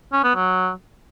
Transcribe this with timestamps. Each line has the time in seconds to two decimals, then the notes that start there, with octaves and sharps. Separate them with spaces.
0.12 C#4
0.24 B3
0.35 F#3